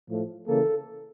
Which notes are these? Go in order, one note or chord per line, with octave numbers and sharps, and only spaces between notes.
A2 F3 A3
C#3 E3 A#3 A4